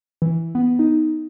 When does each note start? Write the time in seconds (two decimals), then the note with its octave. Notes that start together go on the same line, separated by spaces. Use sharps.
0.22 E3
0.55 B3
0.79 D#4